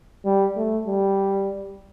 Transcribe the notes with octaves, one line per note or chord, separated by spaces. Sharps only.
G3
A3
G3